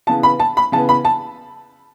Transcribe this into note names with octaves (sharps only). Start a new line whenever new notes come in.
C#3 E3 B3 A5
B5
A5
B5
C#3 E3 B3 A5
B5
A5